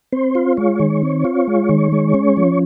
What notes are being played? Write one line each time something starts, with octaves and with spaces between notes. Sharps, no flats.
C4 C5
F4
G#3 C#5
D#3
C4
F4
G#3
D#3
G#3
C#4
F3